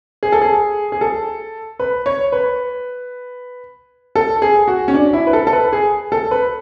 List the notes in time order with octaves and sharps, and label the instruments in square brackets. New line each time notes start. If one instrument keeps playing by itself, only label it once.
[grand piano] G#4
A4
G#4
G#4
A4
B4
C#5
B4
A4
G#4
F#4
C#4
D4
E4
B4
A4
A4
B4
G#4
A4
B4